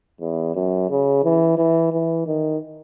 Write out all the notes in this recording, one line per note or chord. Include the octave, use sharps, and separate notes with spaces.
E2
F#2
C#3
E3
E3
E3
D#3